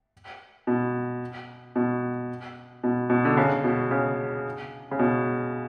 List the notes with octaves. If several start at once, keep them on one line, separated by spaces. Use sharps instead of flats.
B2
B2
B2
B2
D3
C#3
B2
C#3
C#3
B2